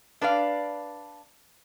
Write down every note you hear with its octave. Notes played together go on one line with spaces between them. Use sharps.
D4 B4 D5 F5